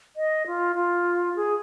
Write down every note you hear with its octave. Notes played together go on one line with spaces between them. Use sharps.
D#5
F4
F4
G#4